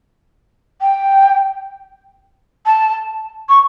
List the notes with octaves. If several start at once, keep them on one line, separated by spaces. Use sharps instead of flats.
G5
A5
C#6